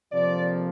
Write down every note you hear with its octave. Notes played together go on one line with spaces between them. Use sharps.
F2 C3 F3 A#3 D5